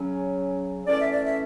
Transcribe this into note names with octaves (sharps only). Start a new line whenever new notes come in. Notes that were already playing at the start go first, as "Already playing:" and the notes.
Already playing: C#3 F#3 C#4
E3 A3 C#4 D5
E5
D5
E5